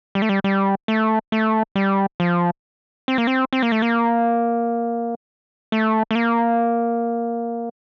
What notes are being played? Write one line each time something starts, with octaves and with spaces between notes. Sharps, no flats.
G3
A3
G3
G3
A3
A3
G3
F3
C4
A#3
C4
C4
A#3
A3
A#3
A3
A3
A#3